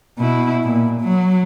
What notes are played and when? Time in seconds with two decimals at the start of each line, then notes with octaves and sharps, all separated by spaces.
0.18 B2 E4
0.64 A#2
1.01 F#3